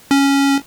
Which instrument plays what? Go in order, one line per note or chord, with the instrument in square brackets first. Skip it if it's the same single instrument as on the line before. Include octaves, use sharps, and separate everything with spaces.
[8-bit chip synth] C#4